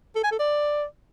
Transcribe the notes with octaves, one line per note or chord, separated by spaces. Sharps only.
A4
G#5
A4
D5